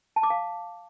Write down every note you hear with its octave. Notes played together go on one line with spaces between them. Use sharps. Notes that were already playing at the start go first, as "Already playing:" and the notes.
A5
D6
F5